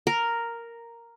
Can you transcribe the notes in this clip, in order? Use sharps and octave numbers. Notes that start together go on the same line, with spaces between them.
A#4